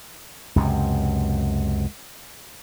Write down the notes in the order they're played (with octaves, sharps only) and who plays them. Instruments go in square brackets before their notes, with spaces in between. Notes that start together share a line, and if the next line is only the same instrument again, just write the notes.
[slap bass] C#2 F#2 C3